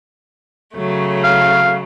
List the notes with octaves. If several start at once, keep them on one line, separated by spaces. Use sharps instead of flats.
C#3 F#3 A3
F5